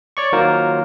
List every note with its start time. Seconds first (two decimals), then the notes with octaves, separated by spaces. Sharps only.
0.17 C#5 D5 C#6
0.32 D#3 F#3 A#3 F4 A#4 C5